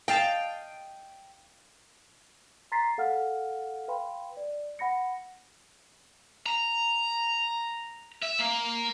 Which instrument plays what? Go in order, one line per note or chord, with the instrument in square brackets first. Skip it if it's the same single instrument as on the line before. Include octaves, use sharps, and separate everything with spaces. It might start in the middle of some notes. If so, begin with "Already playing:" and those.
[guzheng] D#5 F5 A5 [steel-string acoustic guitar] G5
[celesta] A#5 C6 A6 B6 C7
A4 F5 F#5 F6
B4 F5 G5 B5 C6
D5
F#5 B5 A#6 C#7
[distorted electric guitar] A#5
E5
A#3